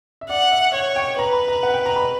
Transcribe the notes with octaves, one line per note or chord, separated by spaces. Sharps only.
E5
D5 F#5
E5
C#5 F#5
G5
B4 A#5
B5
A#5
F#5
G5
A#5
B5